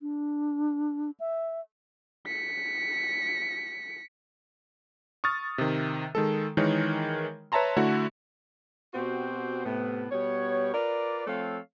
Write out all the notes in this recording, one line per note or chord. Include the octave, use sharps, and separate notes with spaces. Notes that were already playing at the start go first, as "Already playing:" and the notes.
D4
E5
B6 C#7
C#6 D#6 F6 A6
C3 D#3
D#3 G#3 A4
D#3 E3 G#3 D#4 A#4 C#5
B4 C#5 E5 A5 A#5 C6
D3 A3 E4 F#4
B2 C4 F#4 G4 C5
A2 C3 B3
B2 G3 B3 C#5
F4 A#4 B4 D5
F3 A3 C4 A4 C#5 F5